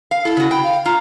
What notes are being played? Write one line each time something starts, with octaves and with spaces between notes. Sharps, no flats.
F5
E4 A4
C#3 F#4
G5 B5
F5
F4 A#5